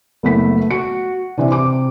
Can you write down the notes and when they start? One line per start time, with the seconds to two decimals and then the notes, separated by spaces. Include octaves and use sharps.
0.23 F#1 A3 B3 B6
0.71 F#4 C#7
1.38 C3 E3 D4
1.52 D6